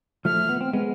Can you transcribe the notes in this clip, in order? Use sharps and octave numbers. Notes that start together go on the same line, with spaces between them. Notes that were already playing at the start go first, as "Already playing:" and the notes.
F3 A3 F6
B3
C4
G#3 B3